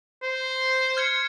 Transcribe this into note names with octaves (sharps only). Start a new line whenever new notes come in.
C5
F6 G#6 C#7